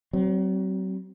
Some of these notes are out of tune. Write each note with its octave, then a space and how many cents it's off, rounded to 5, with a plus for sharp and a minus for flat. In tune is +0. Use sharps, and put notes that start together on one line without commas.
F#3 +40 C4 +0